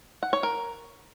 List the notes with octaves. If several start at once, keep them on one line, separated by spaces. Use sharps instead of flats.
F#5
C#5
A#4